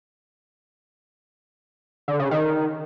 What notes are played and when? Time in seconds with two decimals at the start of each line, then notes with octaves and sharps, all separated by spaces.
2.08 D3
2.20 C#3
2.31 D#3